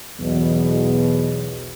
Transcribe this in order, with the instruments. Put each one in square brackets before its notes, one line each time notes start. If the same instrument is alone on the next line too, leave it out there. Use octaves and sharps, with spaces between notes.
[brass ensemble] B1 E2 B2